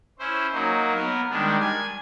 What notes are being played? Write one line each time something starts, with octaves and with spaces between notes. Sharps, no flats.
C#4 E4 C5
F#3 A#3 D#4
B3 A#4
D#3 G3 G#3 D4
G#5